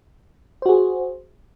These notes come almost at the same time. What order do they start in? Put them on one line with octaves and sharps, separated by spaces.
C5 F#4 G#4